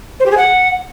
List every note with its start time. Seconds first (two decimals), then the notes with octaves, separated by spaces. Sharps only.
0.19 C5
0.25 G4
0.31 G#4
0.37 F#5